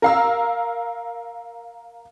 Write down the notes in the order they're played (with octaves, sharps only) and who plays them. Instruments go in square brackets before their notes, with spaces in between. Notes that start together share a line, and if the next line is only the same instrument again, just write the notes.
[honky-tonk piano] A#4 F5 E6